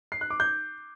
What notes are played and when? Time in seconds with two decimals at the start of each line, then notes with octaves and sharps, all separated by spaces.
0.12 C7
0.21 F#6
0.30 D6
0.40 G6